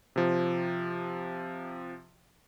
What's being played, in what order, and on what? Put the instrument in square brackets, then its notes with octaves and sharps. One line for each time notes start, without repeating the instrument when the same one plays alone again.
[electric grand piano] C3 F3